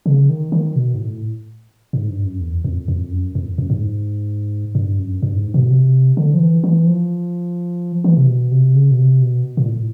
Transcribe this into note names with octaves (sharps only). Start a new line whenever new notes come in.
C#3
D#3
D#3
B2
G#2
A2
G#2
G2
F#2
E2
F2
F2
F#2
F2
F#2
G#2
G2
F#2
G2
G#2
B2
C3
D3
F3
E3
E3
F3
E3
C3
B2
C3
C#3
B2
C3
B2
A#2
A2